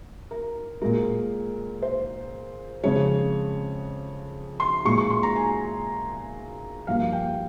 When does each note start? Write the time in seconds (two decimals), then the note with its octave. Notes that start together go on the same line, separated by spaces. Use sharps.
0.31 A#4
0.82 A#2 G#3 A#4
1.82 C5
2.83 F2 C#3 G#3 C#5
4.60 C6
4.85 A#2 G#3 C#6
4.98 C#6
5.10 C6
5.23 A#5
5.36 G#5
6.87 G2 F3 A#3 F5
7.12 G5